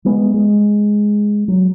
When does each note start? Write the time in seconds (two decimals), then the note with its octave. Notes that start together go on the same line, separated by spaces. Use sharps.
0.05 G3 G#3 B3
0.34 G#3
1.48 F#3